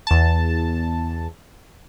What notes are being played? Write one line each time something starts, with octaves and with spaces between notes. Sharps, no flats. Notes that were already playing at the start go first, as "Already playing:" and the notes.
E2 A5